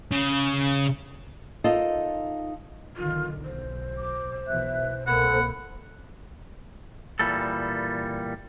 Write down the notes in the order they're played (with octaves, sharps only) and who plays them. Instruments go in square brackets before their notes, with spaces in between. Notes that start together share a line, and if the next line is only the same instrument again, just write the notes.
[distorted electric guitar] C#3
[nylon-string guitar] D#4 F4 A4 A#4 D#5
[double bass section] B1 D3 D#3 [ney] F4
[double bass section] B1 [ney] C5
[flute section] D6
[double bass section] B1 B2 E3 [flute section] E5 F#6
[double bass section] C2 B2 A#3 [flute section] A4 A#4 C5 [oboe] F#5 [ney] B5
[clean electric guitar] A#2 E3 G3 A4